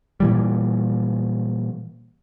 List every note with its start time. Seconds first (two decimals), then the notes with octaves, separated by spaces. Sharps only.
0.20 A#2 E3 G3